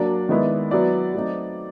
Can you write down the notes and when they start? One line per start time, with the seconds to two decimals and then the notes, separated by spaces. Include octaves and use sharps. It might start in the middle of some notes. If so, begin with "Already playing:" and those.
Already playing: F#3 A#3 D4 D5
0.29 D#3 G#3 B3 E4
0.71 F#3 B3 E4 D5
1.14 F#3 A3 C4 D#4